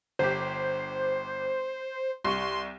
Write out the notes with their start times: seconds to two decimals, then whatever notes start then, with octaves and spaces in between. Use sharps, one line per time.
0.19 G1 G4 C5
2.24 C2 C6 C#6